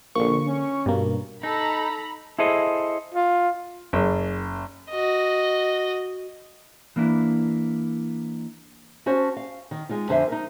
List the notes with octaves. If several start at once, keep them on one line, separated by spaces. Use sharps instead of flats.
A#1 D3 A#3 C#6
C#4
G2 B2 A#3
D#4 A4 A#5 B5
E4 G#4 A4 C5 D#5
F4
F#1
F#4 D#5
E3 A#3 D4 E4
C#4 F#4 C5 A5
F5
D#3
G#3 D#4 F4
F2 D3 D4 C5 E5 G#5
D#4 A#4